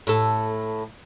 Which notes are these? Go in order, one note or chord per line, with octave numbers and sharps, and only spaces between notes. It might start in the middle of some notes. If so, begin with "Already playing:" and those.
A2 A4